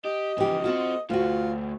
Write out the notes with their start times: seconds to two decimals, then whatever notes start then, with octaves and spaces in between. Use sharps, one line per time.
0.05 G4 D#5
0.38 C#3 E3 F3 G4
0.64 C4 F4 F#4 A4 F#5
1.10 D2 A3 D#4 F4 F#4